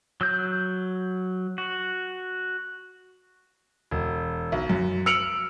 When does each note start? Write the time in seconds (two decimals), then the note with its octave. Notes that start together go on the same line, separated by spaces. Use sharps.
0.21 F#3 E6 G6
1.58 F#4
3.91 E1
4.52 B1
4.69 F#2
5.06 E6 F6 C#7 D7 F7 F#7